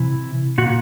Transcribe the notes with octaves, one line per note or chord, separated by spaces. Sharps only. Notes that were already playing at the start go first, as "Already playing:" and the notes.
Already playing: C3 E3
A#2 F#4